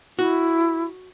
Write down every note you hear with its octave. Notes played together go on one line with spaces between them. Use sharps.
E4 F#4